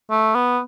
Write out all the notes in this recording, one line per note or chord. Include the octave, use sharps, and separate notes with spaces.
A3
B3